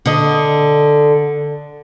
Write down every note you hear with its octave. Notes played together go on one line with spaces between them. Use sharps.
D3 D#5